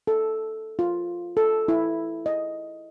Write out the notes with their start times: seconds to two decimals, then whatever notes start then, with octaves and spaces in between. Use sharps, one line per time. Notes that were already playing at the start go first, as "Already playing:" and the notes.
0.07 A4
0.79 F4
1.37 A4
1.68 E4
2.26 D#5